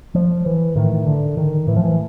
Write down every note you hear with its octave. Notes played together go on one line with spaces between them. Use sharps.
F3
E3
A2 D#3
D3
D#3
A2 E3
F3
E3